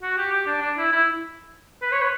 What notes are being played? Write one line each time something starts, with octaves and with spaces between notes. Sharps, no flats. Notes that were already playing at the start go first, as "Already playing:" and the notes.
F#4
G4
G4
D4
D4
E4
E4
B4
C#5
B4